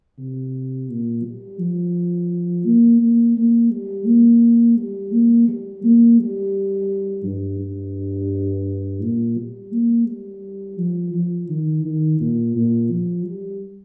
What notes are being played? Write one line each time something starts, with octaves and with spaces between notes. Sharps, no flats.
C3
A#2
G3
F3
A#3
A#3
A#3
G3
A#3
G3
A#3
G3
A#3
G3
G2
G2
A#2
G3
A#3
G3
F3
F3
D#3
D#3
A#2
A#2
F3
G3